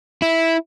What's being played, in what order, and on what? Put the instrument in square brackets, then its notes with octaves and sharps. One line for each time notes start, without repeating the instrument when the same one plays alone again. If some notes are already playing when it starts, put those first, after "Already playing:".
[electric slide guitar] E4